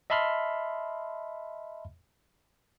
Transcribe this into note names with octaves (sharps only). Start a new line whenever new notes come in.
D#5 E5 A5 B5 C6 F6